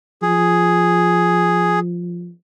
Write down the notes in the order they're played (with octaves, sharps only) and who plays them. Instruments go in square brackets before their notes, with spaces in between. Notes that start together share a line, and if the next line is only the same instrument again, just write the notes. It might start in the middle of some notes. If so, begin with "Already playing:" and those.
[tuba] F3 [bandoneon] G#4